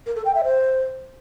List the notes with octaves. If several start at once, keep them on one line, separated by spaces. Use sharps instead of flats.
A#4
A4
G5
E5
C5